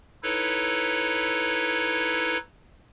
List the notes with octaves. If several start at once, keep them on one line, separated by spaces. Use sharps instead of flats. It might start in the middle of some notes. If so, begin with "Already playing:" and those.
D#4 E4 A4 B4 C#5